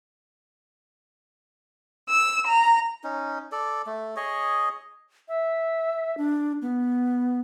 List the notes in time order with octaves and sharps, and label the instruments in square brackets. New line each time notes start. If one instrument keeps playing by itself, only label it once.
[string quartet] E6
A#5
[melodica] C#4 D#4
A4 D5
A3
G#4 C#5 D#5
[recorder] E5
D4
B3